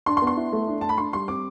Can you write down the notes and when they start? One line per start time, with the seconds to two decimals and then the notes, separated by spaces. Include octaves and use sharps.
0.06 D4 C6
0.17 C6
0.22 B3
0.27 C6
0.37 E4
0.52 A3
0.68 D4
0.81 A3 A5
0.89 B5
0.98 D4 C6
1.13 G3 C6
1.28 C4 D6